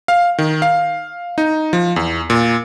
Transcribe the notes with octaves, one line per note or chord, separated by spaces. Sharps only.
F5
D#3
F5
D#4
F3
E2
A#2